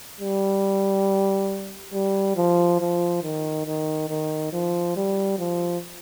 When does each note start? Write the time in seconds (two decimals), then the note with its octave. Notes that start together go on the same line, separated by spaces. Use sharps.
0.21 G3
1.94 G3
2.36 F3
2.80 F3
3.23 D#3
3.66 D#3
4.09 D#3
4.53 F3
4.96 G3
5.39 F3